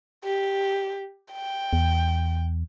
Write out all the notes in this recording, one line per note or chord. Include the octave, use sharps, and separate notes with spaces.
G4
G5
E2